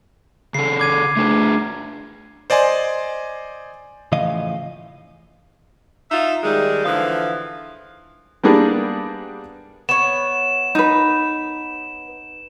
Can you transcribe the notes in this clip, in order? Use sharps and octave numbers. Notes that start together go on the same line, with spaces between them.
C#3 A4 C7
D6 G#6 D#7
A3 D4 G#4
C5 D5 D#5 G#5 C6
A2 C#3 E3 F3 D#5 F5
D#4 F4 E5
D#3 G3 G#3
D3 E3 F3 F5
G3 A#3 B3 D4 G#4
B3 C#5 E7
D#4 B4